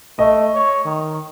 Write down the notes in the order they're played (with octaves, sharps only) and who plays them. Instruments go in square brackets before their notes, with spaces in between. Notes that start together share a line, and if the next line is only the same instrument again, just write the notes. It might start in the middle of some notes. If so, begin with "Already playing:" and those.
[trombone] A3 [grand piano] D#5
[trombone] C#5
D#3